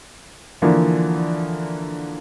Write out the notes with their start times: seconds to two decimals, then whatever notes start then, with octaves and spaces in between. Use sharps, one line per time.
0.62 D3 E3 F3 A#3